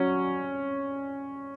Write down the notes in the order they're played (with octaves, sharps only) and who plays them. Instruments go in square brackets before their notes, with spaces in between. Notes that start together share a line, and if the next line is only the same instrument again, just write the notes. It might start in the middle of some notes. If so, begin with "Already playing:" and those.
Already playing: [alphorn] F#3 [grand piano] C#4